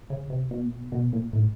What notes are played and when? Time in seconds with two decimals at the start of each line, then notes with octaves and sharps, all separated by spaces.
0.10 C#3
0.30 C3
0.51 B2
0.63 A#2
0.72 B2
0.92 B2
1.13 A#2
1.33 A2